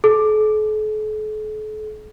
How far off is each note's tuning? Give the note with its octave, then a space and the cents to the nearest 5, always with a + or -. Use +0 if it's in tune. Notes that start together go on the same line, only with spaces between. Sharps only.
A4 -45